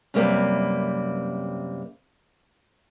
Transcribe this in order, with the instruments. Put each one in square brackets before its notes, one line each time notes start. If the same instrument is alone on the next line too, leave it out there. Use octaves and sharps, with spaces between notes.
[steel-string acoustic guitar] F#2 C3 G3 A#3 C4 B4